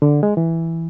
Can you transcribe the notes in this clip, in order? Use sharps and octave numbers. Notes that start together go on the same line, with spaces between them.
D3
G#3
E3